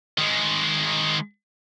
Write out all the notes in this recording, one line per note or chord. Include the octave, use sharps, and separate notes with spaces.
D#3 G#3